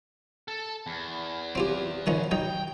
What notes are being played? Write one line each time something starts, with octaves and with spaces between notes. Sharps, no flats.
A4
E2
C4 F4 G4
D#3 F3 C#4
F#3 D#4 G5